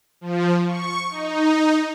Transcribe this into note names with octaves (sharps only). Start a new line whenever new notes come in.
F3
C#6
D#4